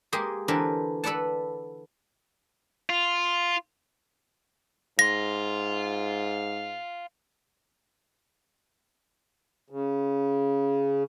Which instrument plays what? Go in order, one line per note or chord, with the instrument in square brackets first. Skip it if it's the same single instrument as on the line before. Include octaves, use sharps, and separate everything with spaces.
[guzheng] G#3 A#3 G4 G#4
D3 E3 C4 D4 A#4 B4
A4 B4 D5 F#5 A5
[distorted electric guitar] F4
[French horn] G#2 [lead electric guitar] F5 C6 [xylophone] A#6
[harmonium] C#3